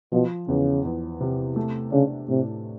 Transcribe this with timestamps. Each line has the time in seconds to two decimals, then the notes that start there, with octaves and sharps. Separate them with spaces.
0.12 B2 F3
0.48 E2 C#3
0.84 E2
1.21 C3
1.56 A3
1.92 C#3 D4
2.28 A2 C3